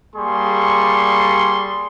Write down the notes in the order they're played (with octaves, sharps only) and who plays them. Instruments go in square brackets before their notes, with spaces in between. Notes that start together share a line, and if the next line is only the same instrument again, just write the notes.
[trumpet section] G3 A#3 G#4 C6 C#6